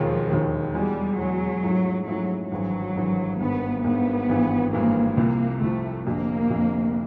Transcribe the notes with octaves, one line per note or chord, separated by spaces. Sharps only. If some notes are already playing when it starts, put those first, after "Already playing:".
Already playing: E1 D#2 D#3 F3
E1 D#2 D#3
E2 B2 G3 G#3
E2 B2 F#3 G#3
G#2 F3 A3 C#4 E4
G#2 F3 F#3 A3 C#4 E4
G#1 G2 E3 F#3
G#1 G2 E3
G#1 G2 D#3 B3
G#1 G2 D#3 B3
G#1 G2 E3
G#1 G2 E3 A#3
C2 C3 F3 A#3
C2 C3 F3 A3
F1 F2 D3 A#3
F1 F2 D3